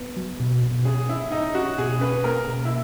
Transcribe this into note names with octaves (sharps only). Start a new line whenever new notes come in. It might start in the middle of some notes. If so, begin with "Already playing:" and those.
Already playing: B3
F#3
B2
B2
C#4 G#4
C#4 E4
C#4 D#4
C#4 F#4
B2 G#4
C#4 B4
A#3 A#4
B2
E4